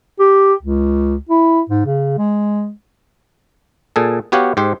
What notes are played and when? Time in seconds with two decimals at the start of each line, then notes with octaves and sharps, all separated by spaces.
0.20 G4
0.63 C#2
1.29 E4
1.70 G#2
1.86 C#3
2.18 G#3
3.96 A#2 G#4 A4
4.32 B3 F#4 G4 C#5 F5 F#5
4.57 G#2 G4 C5